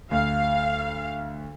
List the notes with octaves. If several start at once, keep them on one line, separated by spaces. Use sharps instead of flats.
D2 F5